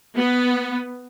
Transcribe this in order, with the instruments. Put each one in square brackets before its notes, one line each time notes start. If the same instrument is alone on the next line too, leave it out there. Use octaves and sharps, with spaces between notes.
[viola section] B3